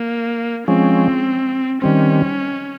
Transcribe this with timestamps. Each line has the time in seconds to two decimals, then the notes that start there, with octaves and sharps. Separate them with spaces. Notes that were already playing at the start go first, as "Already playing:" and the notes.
Already playing: A#3
0.68 F3 G#3 C4 C#4
1.82 D#3 G3 C4 C#4